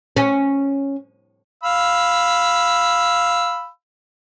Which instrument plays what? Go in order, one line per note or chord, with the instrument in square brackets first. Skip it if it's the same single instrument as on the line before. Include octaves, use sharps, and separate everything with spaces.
[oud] C#4
[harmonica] F5 B5 E6